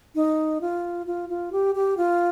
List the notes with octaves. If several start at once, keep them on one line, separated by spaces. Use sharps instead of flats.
D#4
F4
F4
F4
G4
G4
F4